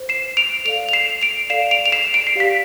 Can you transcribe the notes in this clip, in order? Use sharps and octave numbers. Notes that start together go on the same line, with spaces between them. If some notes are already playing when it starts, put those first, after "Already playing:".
Already playing: C5
C7 E7
D7 F7
A4 D5 F5 D7 F7
F7
C7 E7
D7 F7
A4 D5 F5 C7 E7
D7 F7
F7
C7 E7
D7
C7
G4 D5 F5 B6